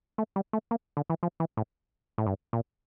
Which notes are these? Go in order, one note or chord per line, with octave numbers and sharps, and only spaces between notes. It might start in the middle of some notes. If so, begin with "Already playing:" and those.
A3
G3
A3
A#3
D3
E3
F3
E3
A2
A2
G2
A#2